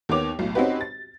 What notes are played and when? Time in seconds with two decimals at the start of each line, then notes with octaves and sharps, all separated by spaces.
0.09 D#2 D#3 B3 C#5 D6 F7
0.39 B1 A2
0.55 C4 C#4 D#4 F#4 G4 B4
0.81 A6